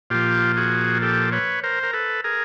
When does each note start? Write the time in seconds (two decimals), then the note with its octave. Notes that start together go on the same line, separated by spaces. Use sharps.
0.10 A#2 F3 F4 G4
0.57 F#4 G#4
1.02 G4 A4
1.32 B4 C#5
1.64 A#4 C5
1.83 A#4
1.93 A4 B4
2.24 G#4 A#4